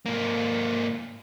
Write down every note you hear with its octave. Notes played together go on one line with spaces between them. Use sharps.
G#2 A#3